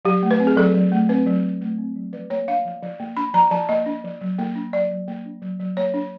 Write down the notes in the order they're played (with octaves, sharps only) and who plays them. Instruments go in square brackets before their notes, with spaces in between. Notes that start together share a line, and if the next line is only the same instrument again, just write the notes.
[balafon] F#3 G4
A3
B4
C4
G#4
F#3 A4
F#3
A3
C4 B4
F#3
F#3
A3
C4
F#3
F3 B4
A#3 C#5
D4 F5
F3
F3
A#3
D4 B5
F3 A#5
F3 A5
A#3 D#5
D4
F3
F#3
A#3
D4
F#3 D5
F#3
A#3
D4
F#3
F#3
A#3 C#5
D4